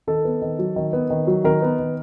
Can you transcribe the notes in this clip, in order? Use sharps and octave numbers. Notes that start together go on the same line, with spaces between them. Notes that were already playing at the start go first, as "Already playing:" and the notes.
D#3 A4
B3
D#3
F#3
D#3
B3
D#3
F#3
D#3 A#4
B3
D#3